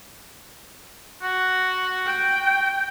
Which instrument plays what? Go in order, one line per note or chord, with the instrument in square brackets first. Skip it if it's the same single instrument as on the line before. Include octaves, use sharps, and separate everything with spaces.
[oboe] F#4
[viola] G5